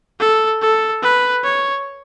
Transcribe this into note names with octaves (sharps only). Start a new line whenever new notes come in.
A4
A4
B4
C#5